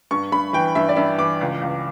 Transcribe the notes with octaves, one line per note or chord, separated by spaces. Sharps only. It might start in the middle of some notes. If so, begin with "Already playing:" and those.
G2 C#6
G2 B5
E3 G5
G2 E5
D5
G2 E5
E3 D6
C#2
C#2